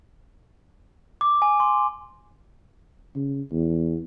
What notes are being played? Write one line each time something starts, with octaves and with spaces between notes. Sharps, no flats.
D6
G#5
C6
C#3
E2